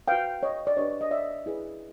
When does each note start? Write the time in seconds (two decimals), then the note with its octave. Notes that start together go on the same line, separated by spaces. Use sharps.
0.08 F#4 B4 F5 G5
0.43 C#5 D#5
0.67 D5
0.77 D4 G4 B4 C#5 D#5
1.01 D#5
1.11 D5 E5
1.46 E4 G#4 B4